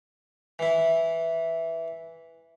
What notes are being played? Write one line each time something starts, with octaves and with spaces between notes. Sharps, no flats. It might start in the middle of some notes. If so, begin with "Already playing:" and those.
E3 E4